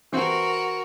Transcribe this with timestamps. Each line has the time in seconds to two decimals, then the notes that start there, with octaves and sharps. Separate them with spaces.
0.12 E3 C4 F#4 A#4